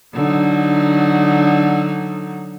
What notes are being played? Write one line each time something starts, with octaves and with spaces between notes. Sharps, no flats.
D3 F#3 D#4